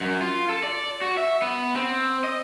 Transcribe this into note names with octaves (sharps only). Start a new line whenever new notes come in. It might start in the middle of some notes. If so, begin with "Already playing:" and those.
F#2
F4
A4
D5
F#4
E5
B3
C4
D#5